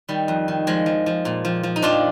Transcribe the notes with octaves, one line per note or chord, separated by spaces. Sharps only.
D#3 G3
F2
D#3
F3 G#3
F3
F3
A#2
F3
F3
D#4
F2 D4 F4